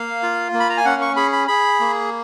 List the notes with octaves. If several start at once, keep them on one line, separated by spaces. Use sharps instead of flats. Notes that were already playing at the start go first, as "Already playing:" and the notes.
Already playing: A#3 F5
F4
A#3
B5
A#5
G#5
C#4 F#5
C#6
G#4 B5
B5
G#4 B5
A#3